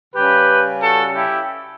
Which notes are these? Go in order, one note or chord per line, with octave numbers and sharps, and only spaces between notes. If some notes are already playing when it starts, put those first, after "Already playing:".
C#3 G3 C#4 G4 B4
F#4 A4
E4 G4